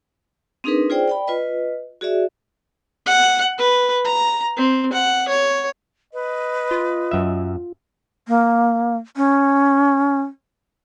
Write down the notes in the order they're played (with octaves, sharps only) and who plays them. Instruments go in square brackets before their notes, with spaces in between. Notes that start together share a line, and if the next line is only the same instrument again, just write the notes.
[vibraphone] C4 D4 D#4 G#4 A#4 B4
F4 G#4 C5 D5 G5
D5 G5 B5
F4 B4 D#5
F#4 G#4 D5 E5
[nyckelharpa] F#5
B4
A#5
C4
F#5
C#5
[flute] B4 [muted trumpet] D#5
[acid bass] F4
[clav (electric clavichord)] F#2 E5
[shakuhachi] A#3
C#4